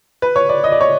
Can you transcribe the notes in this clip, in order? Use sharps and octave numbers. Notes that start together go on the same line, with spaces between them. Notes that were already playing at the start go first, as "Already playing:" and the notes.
B4
C#5
D5
D#5
D5
C#5